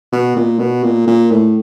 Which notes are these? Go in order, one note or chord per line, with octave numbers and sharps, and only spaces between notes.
B2
A#2
B2
A#2
A#2
A2